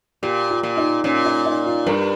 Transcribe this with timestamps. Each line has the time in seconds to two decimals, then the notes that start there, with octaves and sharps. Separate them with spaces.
0.22 A#2 G4
0.50 F4
0.63 A#2
0.77 D#4
1.04 A#2 C#4
1.25 D#4
1.45 D#4
1.66 F4
1.87 G2 A#4